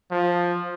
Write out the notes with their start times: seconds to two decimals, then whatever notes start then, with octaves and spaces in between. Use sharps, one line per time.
0.11 F3